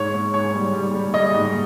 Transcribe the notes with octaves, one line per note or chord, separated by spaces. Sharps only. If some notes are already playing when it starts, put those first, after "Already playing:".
Already playing: G#2 C#5
G#2
G#2 C#5
G3
G3
G3
G3 D#5
G#2